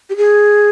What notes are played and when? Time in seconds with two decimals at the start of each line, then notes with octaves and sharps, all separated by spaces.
0.10 G4
0.17 G#4